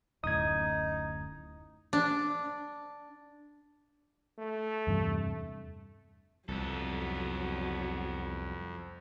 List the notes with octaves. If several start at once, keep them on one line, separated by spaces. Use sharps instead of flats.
D1 F#2 A2 D#4 D#6 G#6
D4
A3
E2 G2 C3
C2 F2 F#3 B3 A4